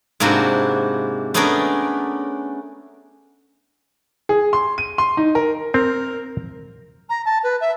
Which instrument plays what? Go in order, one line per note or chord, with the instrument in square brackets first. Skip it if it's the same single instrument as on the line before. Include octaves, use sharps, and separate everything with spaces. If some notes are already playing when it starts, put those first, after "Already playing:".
[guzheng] G#2 C3 A#3 D4 E4 F#4
A3 B3 C#4 D4 G#4 A#4
[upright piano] G#4
C6
D#7
C6
D#4
A#4
[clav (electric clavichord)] C4 [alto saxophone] A#4
[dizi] A#5
A5
B4
E5